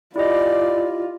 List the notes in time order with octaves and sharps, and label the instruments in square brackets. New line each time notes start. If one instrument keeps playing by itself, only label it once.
[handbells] E4 G4 D#5 [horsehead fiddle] F4 [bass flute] D5